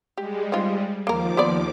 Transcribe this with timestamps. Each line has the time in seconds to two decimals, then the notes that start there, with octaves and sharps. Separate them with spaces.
0.18 G3 G#3 G4
0.52 C4 D#4 F4
1.07 D#2 F3 A#3 A#4 D6
1.37 B3 C5 D5